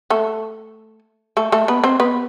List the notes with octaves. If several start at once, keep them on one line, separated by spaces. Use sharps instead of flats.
A3 A4
A3 A4
A3 A4
B3 B4
C4 C5
B3 B4